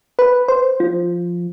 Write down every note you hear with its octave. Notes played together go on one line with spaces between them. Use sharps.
B4
C5
F3